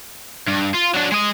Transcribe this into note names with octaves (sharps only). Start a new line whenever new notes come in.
G2
F4
F#3 D4
G#3 D#5